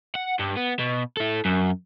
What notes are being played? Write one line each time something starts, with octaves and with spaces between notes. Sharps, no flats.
F#5
G2
B3
B2
E4 A4
F#2